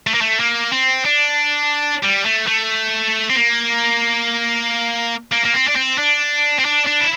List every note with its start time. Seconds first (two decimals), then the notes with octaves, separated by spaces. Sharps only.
0.07 A3
0.14 A#3
0.21 A3
0.40 A#3
0.72 C4
1.05 D4
2.04 G3
2.26 A3
2.48 A3
3.30 C4
3.36 A#3
5.32 A#3
5.45 A#3
5.55 C4
5.68 D4
5.76 C4
5.98 D4
6.59 C4
6.65 D4
6.86 D4
7.00 E4